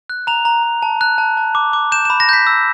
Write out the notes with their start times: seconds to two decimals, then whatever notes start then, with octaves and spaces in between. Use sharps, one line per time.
0.10 F#6
0.27 A#5 F7
0.45 A#5
0.63 A#5
0.82 A5
1.01 F#6
1.18 A5
1.37 A5
1.55 D6
1.73 D6
1.92 G6 E7
2.05 E7
2.10 B5
2.20 A#6
2.29 G6 B6
2.47 E6